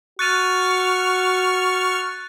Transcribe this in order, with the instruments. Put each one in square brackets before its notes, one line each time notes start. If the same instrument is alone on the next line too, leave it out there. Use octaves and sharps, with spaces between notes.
[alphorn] F#4 [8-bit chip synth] C#6 F6 [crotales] F#6 A6 D#7